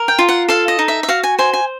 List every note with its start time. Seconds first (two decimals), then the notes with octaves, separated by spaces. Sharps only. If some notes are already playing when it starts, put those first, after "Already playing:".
Already playing: A#4
0.08 G5
0.19 F4
0.29 F#5
0.49 A4 F5
0.68 D#5
0.79 D#4
0.88 E5
1.03 E5
1.09 F#4 F5
1.23 G#5
1.39 C5 G#5
1.53 G#5